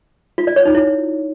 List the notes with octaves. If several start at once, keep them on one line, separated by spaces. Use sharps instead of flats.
F4
D5
C#5
D#4
E4